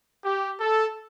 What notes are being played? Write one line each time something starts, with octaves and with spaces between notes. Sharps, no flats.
G4
A4